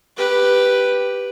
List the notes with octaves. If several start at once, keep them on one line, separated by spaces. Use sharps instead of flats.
G4 B4